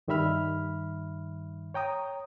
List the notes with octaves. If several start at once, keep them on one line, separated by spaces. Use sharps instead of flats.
G2 D#3 G3 E5 B5 F6
C#5 G5 A#5 D#6